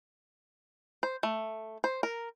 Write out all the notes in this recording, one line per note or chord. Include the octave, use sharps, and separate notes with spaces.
C5
A3
C5
A#4